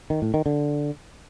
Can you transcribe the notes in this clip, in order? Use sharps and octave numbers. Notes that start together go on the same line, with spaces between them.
D#3
A2
D#3
D3